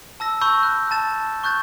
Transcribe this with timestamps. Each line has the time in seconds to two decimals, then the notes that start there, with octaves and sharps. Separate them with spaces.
0.20 A5 E6 A#6
0.41 A5 B5 C#6 E6 G6
0.63 F#6
0.91 A5 A6 E7
1.44 C#6 F#6 G6 A6